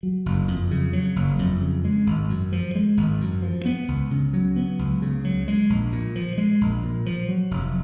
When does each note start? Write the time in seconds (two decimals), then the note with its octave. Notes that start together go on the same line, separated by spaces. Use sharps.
0.03 F#3
0.26 F#1
0.48 F2
0.71 C#3
0.93 F#3
1.16 F#1
1.39 F2
1.61 C#3
1.84 G#3
2.07 G#1
2.29 F#2
2.52 F3
2.75 G#3
2.97 G#1
3.21 F#2
3.42 F3
3.65 B3
3.88 C#2
4.11 C#3
4.33 F#3
4.56 B3
4.79 C#2
5.02 C#3
5.25 F#3
5.48 G#3
5.70 A#1
5.92 A#2
6.16 F3
6.38 G#3
6.61 A#1
6.83 A#2
7.06 F3
7.29 F#3
7.51 F1